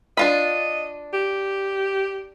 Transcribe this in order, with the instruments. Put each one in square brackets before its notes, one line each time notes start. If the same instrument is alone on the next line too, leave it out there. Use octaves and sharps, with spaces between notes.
[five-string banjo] D4 F4 B5 [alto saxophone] D#5
[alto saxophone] G4